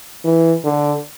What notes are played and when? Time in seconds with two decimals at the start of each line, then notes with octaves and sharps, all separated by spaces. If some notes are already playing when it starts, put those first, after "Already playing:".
0.24 E3
0.64 D3